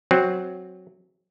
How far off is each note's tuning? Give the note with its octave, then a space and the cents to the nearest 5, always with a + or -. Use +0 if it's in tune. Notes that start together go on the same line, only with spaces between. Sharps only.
F#3 +0 C4 +10